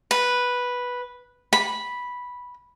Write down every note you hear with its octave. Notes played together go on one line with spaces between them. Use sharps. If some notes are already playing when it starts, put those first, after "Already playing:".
B4
B5